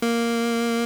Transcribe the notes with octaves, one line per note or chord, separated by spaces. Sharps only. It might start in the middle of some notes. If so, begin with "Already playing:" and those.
A#3